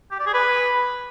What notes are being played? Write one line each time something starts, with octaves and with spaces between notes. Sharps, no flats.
G4
D5
G#4
B4